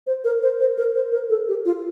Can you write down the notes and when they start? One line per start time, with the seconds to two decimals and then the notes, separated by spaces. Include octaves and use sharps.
0.07 C5
0.24 A#4
0.42 C5
0.60 C5
0.78 A#4
0.95 C5
1.12 A#4
1.30 A4
1.48 G4
1.65 F4